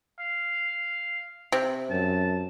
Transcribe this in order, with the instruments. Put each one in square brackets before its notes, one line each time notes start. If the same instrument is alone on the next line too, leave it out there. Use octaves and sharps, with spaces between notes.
[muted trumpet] F5
[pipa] C3
[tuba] F#2 [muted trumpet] A5